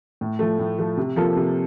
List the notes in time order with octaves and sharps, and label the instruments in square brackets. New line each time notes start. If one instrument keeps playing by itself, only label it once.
[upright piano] A2
F3 A3
A2
F3 A3
C3
F3 A#3 F4 A4
C3